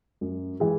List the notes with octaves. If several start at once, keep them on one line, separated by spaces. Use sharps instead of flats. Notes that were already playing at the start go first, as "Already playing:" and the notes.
F#2
E3 G#3